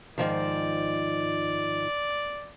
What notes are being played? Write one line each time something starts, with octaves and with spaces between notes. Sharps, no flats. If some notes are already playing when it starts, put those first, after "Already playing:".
G#2 D#3 F3 D5